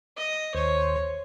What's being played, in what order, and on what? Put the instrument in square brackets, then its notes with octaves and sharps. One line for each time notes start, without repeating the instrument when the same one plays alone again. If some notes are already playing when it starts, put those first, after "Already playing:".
[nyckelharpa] D#5
[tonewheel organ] D#2 C5 [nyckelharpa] C#5